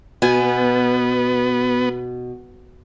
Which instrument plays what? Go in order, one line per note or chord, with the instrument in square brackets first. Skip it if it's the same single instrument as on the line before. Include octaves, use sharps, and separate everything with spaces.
[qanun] B2 G#5 [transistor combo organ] B3